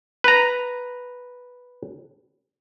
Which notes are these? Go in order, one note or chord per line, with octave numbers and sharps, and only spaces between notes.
B4 A#5